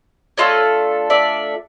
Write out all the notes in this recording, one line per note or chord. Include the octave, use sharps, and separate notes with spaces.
A3 D4 F4 A4 C#5 D#5
D5 E5